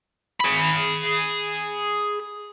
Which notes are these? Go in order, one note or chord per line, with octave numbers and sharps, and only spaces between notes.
G#4 B5